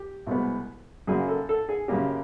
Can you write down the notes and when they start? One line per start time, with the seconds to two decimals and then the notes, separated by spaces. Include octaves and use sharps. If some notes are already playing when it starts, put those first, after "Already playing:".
Already playing: G4
0.27 C2 B2 G#3 B3
1.07 F#2 C#3 F#3 A#3 G#4
1.28 A4
1.49 A4
1.69 G#4
1.88 F#2 C#3 F#3 A#3 G4